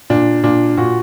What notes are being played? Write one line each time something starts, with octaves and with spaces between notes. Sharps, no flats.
A#2 D4
A#2 D4
A#2 F#4